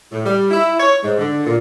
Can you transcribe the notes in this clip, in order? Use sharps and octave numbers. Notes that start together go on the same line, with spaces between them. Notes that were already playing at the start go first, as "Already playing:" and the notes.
A2
G3
E4
C#5
G#2
D3
A#2